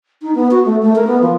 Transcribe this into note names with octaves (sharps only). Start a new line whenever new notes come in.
D#4
B3
F#4
A3
A3
A#4
B3
F3